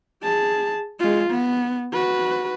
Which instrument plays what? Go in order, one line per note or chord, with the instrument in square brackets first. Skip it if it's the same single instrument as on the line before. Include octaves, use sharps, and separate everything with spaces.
[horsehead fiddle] G#4 A5
G#3 F4
B3
F#4 B4